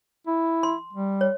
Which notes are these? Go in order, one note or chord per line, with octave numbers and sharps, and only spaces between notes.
E4
C6
G3
C#5